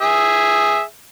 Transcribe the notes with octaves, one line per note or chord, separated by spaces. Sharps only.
G#4 E5